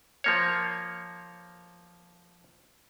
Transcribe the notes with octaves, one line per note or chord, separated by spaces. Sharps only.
F3 A#3 C#5